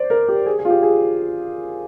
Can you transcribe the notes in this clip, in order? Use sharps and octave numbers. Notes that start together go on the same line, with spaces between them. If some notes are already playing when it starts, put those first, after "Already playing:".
Already playing: C5 D5
A#4
G4
G#4
G#4
F4
G4
G#4